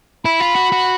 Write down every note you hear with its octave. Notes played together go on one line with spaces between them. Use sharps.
E4 B5
F4
F#4
F#4